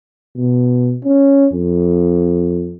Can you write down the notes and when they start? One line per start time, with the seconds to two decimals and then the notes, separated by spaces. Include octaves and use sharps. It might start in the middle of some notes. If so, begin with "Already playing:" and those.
0.36 B2
1.04 C#4
1.53 F2